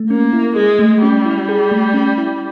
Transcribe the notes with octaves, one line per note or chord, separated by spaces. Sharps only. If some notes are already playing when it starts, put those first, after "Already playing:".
Already playing: A3
A#3 C#4
E4
G#3 G#4
A3
G3 C#4
E4
G#4
A3
C#4
E4